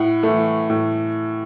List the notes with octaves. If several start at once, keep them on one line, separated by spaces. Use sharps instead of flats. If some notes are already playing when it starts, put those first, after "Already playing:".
Already playing: A2 F#5
E3 A3
A2